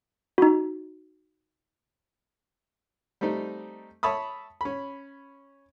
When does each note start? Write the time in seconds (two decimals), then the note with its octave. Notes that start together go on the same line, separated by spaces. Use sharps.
0.38 D#4 F#4
3.21 G3 A3 C4 D#4
4.03 C#5 E5 A5 B5 D#6
4.61 C#4 B5